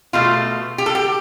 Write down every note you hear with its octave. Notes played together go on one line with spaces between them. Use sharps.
B2 A3 F4
G4
A4
G4